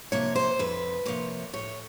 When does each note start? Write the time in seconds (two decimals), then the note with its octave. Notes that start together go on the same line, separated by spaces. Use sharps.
0.12 C3 F3 A#3 C#5
0.36 C5
0.59 F2 B4
1.06 C3 F3 A#3 C#5
1.53 A2 C#5